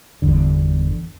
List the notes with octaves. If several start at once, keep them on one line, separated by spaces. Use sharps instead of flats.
G1 E2 D3